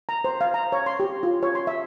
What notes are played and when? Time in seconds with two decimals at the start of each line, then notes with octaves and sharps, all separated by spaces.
0.09 A#5
0.24 C5
0.41 F5
0.54 A#5
0.72 C#5
0.86 C6
1.00 G4
1.23 F4
1.43 C#5
1.55 C6
1.67 E5